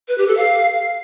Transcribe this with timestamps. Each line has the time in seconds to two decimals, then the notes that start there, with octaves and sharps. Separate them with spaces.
0.08 B4
0.18 G4
0.27 A4
0.37 F5